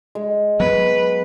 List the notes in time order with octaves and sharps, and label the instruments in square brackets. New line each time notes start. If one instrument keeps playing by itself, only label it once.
[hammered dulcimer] G#3
[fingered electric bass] F#3 B3 [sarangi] B4